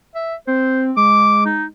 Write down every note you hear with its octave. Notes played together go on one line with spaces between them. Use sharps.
E5
C4 C5
G#3 D6
D#4